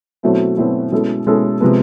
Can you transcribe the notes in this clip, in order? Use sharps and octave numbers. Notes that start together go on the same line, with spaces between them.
B2 F#3 A3 C4 E4
B2 F#3 A3 C4 E4
B2 G#3 C#4 E4 A4
B2 G#3 C#4 E4 A4
C3 F3 G#3 B3